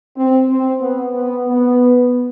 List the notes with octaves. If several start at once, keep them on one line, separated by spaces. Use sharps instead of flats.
C4
C4
B3
B3
B3